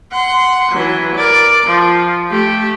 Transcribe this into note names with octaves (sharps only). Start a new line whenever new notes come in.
F#5 C6
E3 F#3
A#4 D5
F3
A3 G4